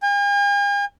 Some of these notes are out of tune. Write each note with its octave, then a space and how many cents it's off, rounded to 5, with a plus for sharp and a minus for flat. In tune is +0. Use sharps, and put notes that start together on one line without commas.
G#5 -45